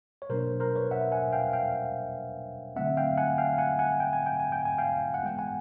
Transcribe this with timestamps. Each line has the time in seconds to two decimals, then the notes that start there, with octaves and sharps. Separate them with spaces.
0.22 C#5
0.29 B2 F#3 A#3 D4 A#4 C5
0.60 A#4 C5
0.76 B4 C#5
0.91 E5 F#5
1.12 F#5 G#5
1.33 F5 G5
1.53 F5 G5
2.76 D3 F#3 A3 C4 E5 F#5
2.97 F5 G5
3.17 F#5 G#5
3.38 F5 G5
3.58 F#5 G#5
3.79 F#5 G#5
4.00 G5
4.13 G#5
4.26 G5
4.40 G#5
4.52 G5
4.65 G#5
4.78 F5 G5
5.14 F#5
5.23 E3 G#3 B3 G5
5.39 F#5 G#5